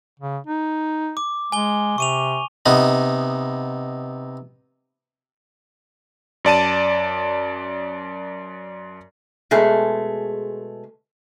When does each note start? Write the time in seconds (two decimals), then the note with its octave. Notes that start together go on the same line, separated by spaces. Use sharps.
0.19 C#3
0.47 D#4
1.17 D6
1.52 G#3 G#5 G7
1.98 C3 C#6 D#7 F7
2.66 C3 B3 D#4
6.45 F#2 D5 A5 D#7
9.51 B2 G#3 A3 G#4